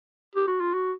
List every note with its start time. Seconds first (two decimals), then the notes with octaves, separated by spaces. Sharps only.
0.36 G4
0.48 F#4
0.61 F4
0.74 F#4